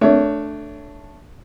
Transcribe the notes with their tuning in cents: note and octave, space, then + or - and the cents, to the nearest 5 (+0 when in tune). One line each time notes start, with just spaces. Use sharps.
A3 +0 D4 +0 C#5 +25